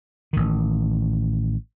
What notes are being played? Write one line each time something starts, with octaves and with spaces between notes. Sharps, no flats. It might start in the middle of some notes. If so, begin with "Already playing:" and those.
A1 D#3